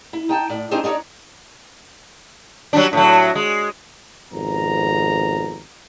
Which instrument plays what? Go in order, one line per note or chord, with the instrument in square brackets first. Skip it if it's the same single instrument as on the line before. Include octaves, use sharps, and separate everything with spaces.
[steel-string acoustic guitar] E4
D#4 G5 A5
A2 D5
C4 D4 D#4 G#4 C5
D4 D#4 F#4 C#5 D5
[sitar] F#3 G3 D4
A2 F#3
G#3
[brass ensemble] G#1 F2 C3 B3 A#5